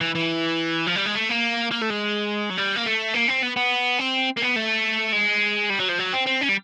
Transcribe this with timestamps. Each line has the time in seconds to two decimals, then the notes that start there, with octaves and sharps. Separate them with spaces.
0.01 E3
0.15 E3
0.87 F3
0.96 G3
1.06 G#3
1.15 A3
1.29 A#3
1.72 A#3
1.82 A3
1.90 G#3
2.50 F#3
2.57 G3
2.76 A#3
2.86 A3
3.14 A#3
3.28 C4
3.43 B3
3.57 B3
3.99 C4
4.37 A#3
4.42 B3
4.56 A3
5.12 G#3
5.70 G3
5.79 F#3
5.89 F3
5.98 F#3
6.13 C4
6.26 C4
6.41 C#4
6.49 G3